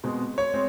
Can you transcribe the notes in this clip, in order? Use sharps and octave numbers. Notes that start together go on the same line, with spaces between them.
B2 G#3 C4
C#5
G#3 C4